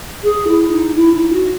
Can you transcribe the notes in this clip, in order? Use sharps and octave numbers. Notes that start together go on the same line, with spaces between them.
G#4
E4
D#4
E4
D#4
F#4